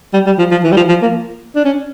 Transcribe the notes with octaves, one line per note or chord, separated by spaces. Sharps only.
G3
G3
F3
F3
E3
G3
F3
F3
A#3
D4
C#4